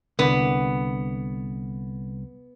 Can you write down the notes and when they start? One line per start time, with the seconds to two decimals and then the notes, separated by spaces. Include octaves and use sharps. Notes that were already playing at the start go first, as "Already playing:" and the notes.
0.19 C2 D3 B3